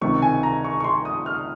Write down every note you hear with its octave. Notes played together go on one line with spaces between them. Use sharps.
C#2 C3 D#3 C#6
G#5
A#5
C#6
C#6
C6
D#6
F6